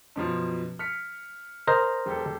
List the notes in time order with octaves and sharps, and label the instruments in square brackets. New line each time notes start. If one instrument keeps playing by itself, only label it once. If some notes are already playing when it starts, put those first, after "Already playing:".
[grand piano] F#2 B2 F3
F6 B6 C#7
[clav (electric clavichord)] A#4 C5 D#5
[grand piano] E1 G4 A4